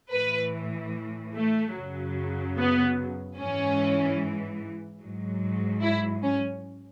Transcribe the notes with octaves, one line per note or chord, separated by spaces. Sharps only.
A2 E3 B4
A3
F#2 C#3 F#3
B3
G#2 E3 C#4
G#2 F#3
E4
C#4